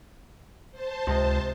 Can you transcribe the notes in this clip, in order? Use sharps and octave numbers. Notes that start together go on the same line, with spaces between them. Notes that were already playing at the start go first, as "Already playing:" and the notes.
C5 A5
C#2 C3 D#5